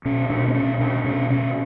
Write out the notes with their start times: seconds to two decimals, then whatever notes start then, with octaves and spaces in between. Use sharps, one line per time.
0.05 B2 C#4
0.30 B2 D4
0.48 C4
0.54 B2 C#4
0.80 B2 D4
1.05 B2 C#4
1.30 B2 C#4